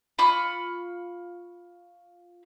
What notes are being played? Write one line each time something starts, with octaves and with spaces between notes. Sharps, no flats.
F4 B5 C#6